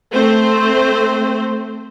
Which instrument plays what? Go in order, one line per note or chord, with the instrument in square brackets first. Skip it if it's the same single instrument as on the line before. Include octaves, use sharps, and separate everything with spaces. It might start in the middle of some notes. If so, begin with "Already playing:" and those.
[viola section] A3 C4 C5